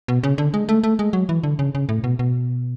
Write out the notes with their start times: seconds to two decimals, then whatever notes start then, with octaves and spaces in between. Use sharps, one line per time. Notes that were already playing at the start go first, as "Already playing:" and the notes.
0.08 B2
0.23 C#3
0.38 D3
0.54 G#3
0.69 A3
0.83 A3
0.99 G#3
1.13 F#3
1.29 E3
1.43 D3
1.59 C#3
1.75 C#3
1.89 A2
2.04 B2
2.19 B2